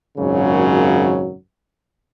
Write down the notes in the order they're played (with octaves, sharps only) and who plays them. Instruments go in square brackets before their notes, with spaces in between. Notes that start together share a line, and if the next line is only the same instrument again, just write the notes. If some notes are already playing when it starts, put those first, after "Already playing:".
[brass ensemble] G#1 F#2 A#2 C#3 F#3